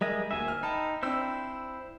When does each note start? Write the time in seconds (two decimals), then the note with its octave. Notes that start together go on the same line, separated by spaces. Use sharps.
0.01 G3 G#3 A#4 D#5 E5
0.31 D2 A#3 E5 G#5
0.48 F6
0.63 D#4 G5 A5 B5
1.03 C4 D4 E4 C5 E6